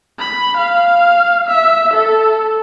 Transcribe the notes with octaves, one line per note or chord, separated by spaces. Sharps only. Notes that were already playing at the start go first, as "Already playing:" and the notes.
B5
F5
E5
A4